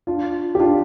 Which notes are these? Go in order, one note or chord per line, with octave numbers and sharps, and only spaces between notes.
D4 F4
G4
D4 F4